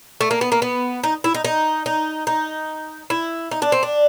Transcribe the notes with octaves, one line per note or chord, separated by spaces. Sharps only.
A3
A#3
B3
A#3
B3
D#4
E4
D#4
D#4
D#4
D#4
E4
D#4
D4
C4
D4